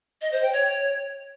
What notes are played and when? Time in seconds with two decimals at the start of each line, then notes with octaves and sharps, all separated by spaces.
0.22 D#5
0.32 C5
0.42 G5
0.53 C#5